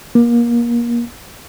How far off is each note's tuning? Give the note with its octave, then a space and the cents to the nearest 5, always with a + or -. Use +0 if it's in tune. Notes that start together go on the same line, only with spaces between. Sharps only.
A#3 +30